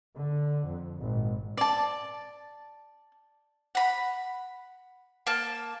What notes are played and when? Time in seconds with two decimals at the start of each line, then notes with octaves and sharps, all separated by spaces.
0.15 D3
0.67 F2
0.97 G#1 A#2
1.57 D5 A5
3.75 F#5 B5
5.27 A#3 A5